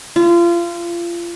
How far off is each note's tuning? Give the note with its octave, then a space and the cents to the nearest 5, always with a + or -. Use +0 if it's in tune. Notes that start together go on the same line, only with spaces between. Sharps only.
F4 -30